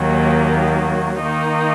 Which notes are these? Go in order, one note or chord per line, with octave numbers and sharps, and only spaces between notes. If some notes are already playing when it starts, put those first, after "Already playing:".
Already playing: D#2 D#3 F#3 A#3
D#3 A#3 D#4